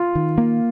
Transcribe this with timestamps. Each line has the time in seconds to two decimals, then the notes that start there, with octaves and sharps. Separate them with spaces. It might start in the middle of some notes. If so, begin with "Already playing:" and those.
Already playing: F4
0.15 D#3
0.38 A#3